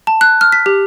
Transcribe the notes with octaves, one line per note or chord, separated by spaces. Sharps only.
A5
F#6
F6
B6
G4